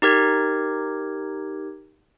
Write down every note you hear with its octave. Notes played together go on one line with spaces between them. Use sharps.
D#4 G4 A#4 G#6